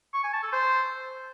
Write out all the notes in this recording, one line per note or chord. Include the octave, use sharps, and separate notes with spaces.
C#6
G#5
A5
A4
C5